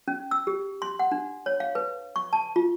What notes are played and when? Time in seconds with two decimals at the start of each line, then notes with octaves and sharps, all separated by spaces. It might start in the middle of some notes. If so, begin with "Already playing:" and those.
0.08 C#4
0.31 E6
0.47 G4
0.82 C6
0.99 F#5
1.12 D4
1.46 C#5
1.60 F5
1.75 B4
2.16 C#6
2.33 A5
2.56 F4